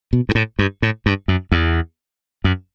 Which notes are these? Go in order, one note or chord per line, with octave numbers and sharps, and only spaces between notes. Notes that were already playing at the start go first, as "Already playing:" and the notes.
B2
G2
A2
G2
A2
G2
F#2
E2
F#2